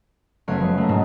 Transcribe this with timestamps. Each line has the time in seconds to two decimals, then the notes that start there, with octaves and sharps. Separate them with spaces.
0.48 F#1 A3 B3 C#5 F5 D7
0.59 F3 G#3
0.78 A3 A#3
0.89 G#2 B2 G#3